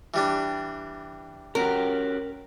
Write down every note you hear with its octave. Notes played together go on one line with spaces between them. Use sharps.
E3 G3 D4
C#4 F#4 G4 A#4